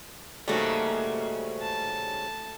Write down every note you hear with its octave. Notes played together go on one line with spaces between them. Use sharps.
G#2 C#3 G3 A3 A#3 F#4
A5